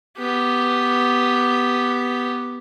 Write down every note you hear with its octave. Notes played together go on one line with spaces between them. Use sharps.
B3 G4